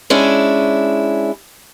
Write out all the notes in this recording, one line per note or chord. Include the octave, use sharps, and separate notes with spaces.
G#3 C#4 D4 E4